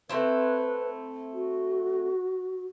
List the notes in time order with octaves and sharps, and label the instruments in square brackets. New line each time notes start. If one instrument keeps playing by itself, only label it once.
[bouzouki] A3 C4 E4 [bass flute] B4
[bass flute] F#4